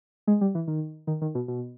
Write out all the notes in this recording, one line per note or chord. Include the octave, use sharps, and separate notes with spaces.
G#3
G3
E3
D#3
D#3
D#3
B2
B2